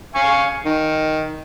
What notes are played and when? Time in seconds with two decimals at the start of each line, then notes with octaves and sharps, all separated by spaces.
0.15 F5 G#5 C#6
0.66 D#3